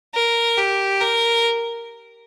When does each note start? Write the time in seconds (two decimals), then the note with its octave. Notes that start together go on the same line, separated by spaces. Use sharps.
0.15 A#4
0.58 G4
1.00 A#4